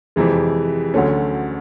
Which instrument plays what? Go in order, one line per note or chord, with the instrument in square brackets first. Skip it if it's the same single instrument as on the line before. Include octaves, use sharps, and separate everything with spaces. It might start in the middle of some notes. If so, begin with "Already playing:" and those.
[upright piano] F2 C3 E3 G#3
D2 D3 F#3 A3 C#4